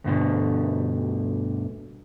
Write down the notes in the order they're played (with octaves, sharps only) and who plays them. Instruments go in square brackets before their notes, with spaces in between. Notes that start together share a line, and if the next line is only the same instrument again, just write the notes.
[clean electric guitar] D2 G2 B2 D3